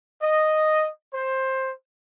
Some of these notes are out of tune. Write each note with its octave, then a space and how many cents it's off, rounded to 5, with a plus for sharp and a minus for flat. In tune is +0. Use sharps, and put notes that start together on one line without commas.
D#5 -5
C5 +15